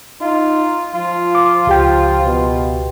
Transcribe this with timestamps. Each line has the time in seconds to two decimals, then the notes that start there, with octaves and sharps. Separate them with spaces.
0.21 D#4 F4
0.95 F3 F4
1.35 D6
1.67 C#2 G4 G5
2.22 B2